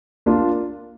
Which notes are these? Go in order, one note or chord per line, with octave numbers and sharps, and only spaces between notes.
A#3 D4 F4